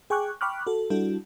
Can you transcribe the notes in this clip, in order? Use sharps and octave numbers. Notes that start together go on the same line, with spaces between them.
G#4 G5 G#5 C#6 D6 F#6
G5 B5 C#6 D6 F6 F#6
F#4 A4
G3 D4 E4 F#4 A4